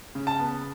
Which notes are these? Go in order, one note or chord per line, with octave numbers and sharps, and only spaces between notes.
C#3
A5
B3